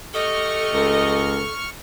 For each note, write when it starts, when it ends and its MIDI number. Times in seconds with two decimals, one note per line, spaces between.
0.13 1.30 57
0.13 1.30 67
0.13 1.51 69
0.13 1.30 75
0.13 1.70 85
0.13 1.70 89
0.74 1.45 37